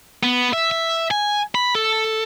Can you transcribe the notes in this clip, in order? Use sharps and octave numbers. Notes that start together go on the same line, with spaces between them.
B3
E5
E5
G#5
B5
A4